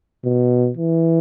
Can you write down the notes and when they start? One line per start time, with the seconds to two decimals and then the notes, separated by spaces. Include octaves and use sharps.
0.24 B2
0.77 E3